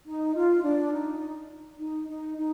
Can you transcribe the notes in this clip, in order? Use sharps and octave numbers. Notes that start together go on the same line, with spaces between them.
D#4
F4
D4
D#4
D#4
D#4
D#4